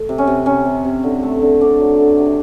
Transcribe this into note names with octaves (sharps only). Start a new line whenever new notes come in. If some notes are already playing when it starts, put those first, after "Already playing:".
Already playing: A3
C3
C#4
C3
C3 C#4
C3
C3
D3
A3
D3
D3 D4
F#3
A3
C3